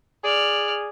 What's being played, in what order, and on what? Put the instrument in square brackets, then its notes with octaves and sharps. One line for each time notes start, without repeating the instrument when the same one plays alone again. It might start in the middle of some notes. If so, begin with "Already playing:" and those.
[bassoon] G#4 [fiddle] D5 F6